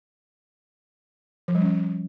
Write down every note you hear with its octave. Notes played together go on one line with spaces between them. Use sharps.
F3
G3
C#4